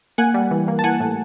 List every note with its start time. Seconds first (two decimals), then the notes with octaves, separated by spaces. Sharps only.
0.18 A#3 F#5 G#5
0.34 G3
0.51 E3
0.68 A#3
0.79 A5
0.84 E3 F#5 G#5
1.00 A2